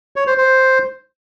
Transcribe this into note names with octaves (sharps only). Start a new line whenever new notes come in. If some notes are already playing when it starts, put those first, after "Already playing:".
C#5
C5
C5